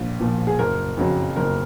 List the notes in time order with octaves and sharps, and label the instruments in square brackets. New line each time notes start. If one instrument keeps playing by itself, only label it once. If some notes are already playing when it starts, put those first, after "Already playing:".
Already playing: [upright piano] A#1 A#2
A#2 F3
G#4
F#1 A#4
F2 C#3 F#3
F#1 A#4